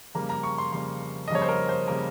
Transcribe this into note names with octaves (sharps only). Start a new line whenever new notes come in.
F2 C#3 G3 A#3 A#5
A#5
C#6
C6
F2 C#3 G3 A#3 C6
D#5
F2 C#3 G3 A#3 C#5
C5
A#4
C5
C#3 G3 A#3 A#4